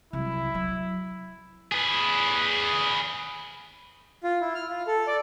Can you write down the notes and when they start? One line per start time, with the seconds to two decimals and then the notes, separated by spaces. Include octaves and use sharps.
0.13 C2 F#2 E4
0.54 F#3
1.72 G#4 B4
4.23 F4
4.41 E4
4.55 F6
4.69 F4
4.87 A4
5.07 D5